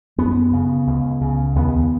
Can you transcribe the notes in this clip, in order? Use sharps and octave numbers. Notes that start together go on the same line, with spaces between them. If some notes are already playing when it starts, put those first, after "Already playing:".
F#2 B3
C#3
C#2
C#3
D#2 B3